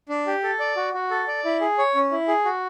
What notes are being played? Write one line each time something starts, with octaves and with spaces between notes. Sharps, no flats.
D4
G4
A4
D5
F#4
F#4
A4
D5
E4
G#4
C#5
C#4
E4
G#4
F#4